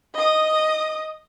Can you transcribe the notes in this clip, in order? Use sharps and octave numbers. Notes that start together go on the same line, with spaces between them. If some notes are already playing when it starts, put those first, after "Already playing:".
D#5 D#6